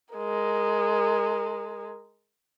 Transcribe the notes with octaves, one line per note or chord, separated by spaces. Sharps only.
G#3 A#4